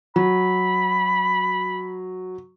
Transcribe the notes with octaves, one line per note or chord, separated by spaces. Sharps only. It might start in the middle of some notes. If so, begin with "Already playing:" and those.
F#3 B5